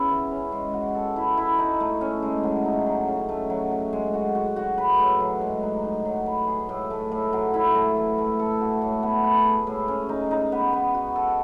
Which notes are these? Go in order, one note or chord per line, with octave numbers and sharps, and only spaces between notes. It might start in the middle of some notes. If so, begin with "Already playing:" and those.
Already playing: B3 C#4 E4 G#4
E3
C#4
G#3
F#4
A4
E4
E4
D#4
A3
C#4
G#3
F#3
D#4
F#3
C#3
A3
F#3
F#4
G#3
F#4
F#4
F#4
B4
A2
F#3
G#3
D#4
D#4
F#3
B4
G#4
A2
A3
A2
F#3
E4
A3
E3
A3
A4
F#4
A2
B3
B4
G#4
A2
C#4
D#4
D#4
B3
B3
F#4
A4